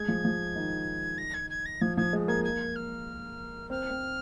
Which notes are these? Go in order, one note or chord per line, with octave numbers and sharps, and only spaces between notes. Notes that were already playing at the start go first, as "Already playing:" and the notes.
Already playing: G#3 G#6
F3
F3
D#3
A#6
G#6
G#6
A#6
F3 G#6
F3 G#6
G#3
A#3 G#6
G#6
F6
C4 F6
C4